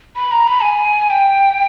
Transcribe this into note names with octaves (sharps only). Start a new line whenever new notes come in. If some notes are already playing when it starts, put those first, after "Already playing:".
B5
A#5
B5
G#5
G5